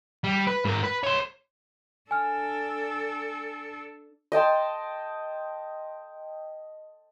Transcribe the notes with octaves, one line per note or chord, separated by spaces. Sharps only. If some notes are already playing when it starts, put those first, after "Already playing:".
G3
B4
G#2 A#4
B4
C#5 C6
D4 A4 G#5 F6
D#5 G5 A5 C6